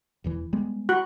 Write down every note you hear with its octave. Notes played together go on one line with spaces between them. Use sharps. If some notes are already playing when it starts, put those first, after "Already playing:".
E1 E2 E3
G3 G#3 B3
F#4 F#6